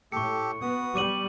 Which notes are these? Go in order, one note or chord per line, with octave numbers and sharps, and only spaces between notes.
A2 G4 A4 C#6 C#7
B3 F#4 D#6
G3 D6 D#7 F#7